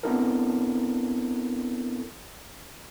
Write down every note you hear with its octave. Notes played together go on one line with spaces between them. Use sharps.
B3 C4 D4 E4 A4 A#4